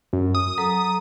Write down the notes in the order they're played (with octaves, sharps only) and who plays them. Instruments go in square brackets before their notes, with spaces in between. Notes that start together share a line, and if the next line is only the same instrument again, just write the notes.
[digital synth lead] F#2
D#6
[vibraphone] F#3 A4 A#5